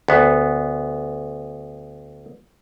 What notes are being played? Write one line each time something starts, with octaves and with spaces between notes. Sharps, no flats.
D2 B3